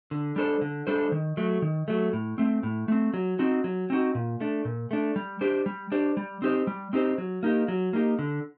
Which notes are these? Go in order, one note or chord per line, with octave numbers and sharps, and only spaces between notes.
D3
G3 D4 A4 C5
D3
G3 D4 A4 C5
D#3
F#3 A3
D#3
F#3 A3
A2
A3 C4
A2
A3 C4
F#3
C4 D#4 F#4
F#3
C4 D#4 F#4
A#2
A3 D4
A#2
A3 D4
G3
D4 G4 C5
G3
D4 G4 C5
G3
C4 D#4 G4 C5
G3
C4 D#4 G4 C5
F#3
A#3 D#4 G4
F#3
A#3 D#4 G4
D3